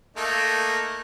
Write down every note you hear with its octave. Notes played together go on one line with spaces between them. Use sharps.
A3 A#3 D#4